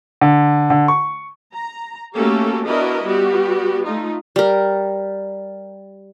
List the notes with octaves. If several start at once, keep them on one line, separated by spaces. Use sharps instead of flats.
D3
D3
C#6
A#5
A3 A#3 C#4 F#4 G4 A4
B3 D4 E4 F#4 A#4 D#5
G3 B3 F#4 G4
A3 D#4 F4
G3 A#4